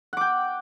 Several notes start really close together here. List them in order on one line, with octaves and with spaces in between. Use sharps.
F#5 D6 G5